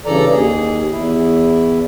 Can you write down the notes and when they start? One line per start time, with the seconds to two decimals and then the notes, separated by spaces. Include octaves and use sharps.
0.06 G2 C#3 E3 A4 D5 A#5
0.31 D#2 G#4
0.92 E2 E4